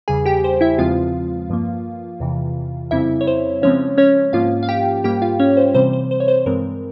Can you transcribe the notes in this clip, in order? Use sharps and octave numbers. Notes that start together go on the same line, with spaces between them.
E2 C#3 G3 G#4 G#5
G4 G5
C5
E4 E5
E2 C#3 F3 G#3 C4 F4 F5
G2 F3 A#3
E2 C3 E3
F2 C#3 G3 C4 E4 E5
C#5
C5
C#3 F3 G#3 C4 C#4 C#5
C#4 C#5
G#2 F3 A#3 C#4 F4 F5
F5
G4 G5
G#2 G3 A#3 G4 G5
F4 F5
C#4 C#5
C5
C3 E3 G3 C4 C5
C5
C5
C#5
C5
G2 E3 G#3 C4 A#4